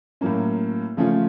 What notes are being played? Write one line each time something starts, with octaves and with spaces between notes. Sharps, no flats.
A2 F#3 A#3 C#4
C#3 F3 A3 C#4 F4